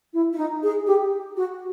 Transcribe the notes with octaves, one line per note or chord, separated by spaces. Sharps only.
E4
E4
D#4
G#4
G4
F#4